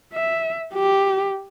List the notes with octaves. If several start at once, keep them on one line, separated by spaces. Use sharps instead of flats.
E5
G4